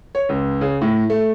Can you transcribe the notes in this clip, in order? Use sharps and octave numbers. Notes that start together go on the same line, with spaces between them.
C#5
C#2
C#3
A2
A3